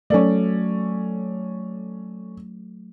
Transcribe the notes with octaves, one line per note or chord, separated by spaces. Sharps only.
F#3 A3 C#4 A4 D5